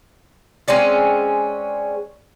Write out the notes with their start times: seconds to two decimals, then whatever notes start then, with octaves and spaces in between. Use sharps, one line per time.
0.68 G#3 C4 C#4 D5